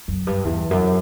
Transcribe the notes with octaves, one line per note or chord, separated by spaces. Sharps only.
F#2
G2
E2
F#2